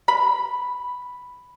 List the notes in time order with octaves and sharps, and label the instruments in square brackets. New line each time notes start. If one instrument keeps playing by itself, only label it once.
[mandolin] B5